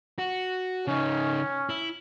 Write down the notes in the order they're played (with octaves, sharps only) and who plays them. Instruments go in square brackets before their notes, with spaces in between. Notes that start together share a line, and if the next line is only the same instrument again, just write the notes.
[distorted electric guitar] F#4
[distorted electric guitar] C#3 D#4 [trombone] C#4
[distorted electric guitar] E4